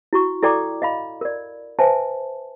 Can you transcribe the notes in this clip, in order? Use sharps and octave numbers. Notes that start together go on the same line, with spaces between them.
E4 F#4 C#6
E4 A4 D5 G5 A#5 D6
D#5 F5 B5
A#4 D5
B4 C5 E5 G#5 A5